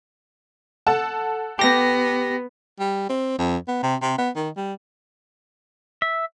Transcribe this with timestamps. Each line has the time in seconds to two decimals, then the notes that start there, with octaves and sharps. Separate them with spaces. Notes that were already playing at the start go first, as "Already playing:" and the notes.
0.87 A4 F#5 A5
1.59 B3 G4 A#6
2.79 G3
3.09 C4
3.38 F2
3.68 B3
3.83 C3
4.02 C3
4.18 B3
4.36 D#3
4.57 G3
6.02 E5